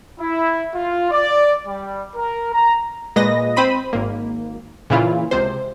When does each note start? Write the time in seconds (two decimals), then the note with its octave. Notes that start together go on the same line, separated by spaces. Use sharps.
0.18 E4
0.74 F4
1.11 D5
1.65 G3
2.15 A#4
2.52 A#5
3.16 A#2 G#3 B4 D#5 D#6 A#6
3.56 C4 C5 B5 D#7
3.93 G#1 A#3
4.90 A#2 C#3 E3 E4 F4
5.31 C#2 C3 C5